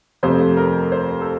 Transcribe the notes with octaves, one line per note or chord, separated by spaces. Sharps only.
F2 C3 F3 A3 C5
A#4
C5
A4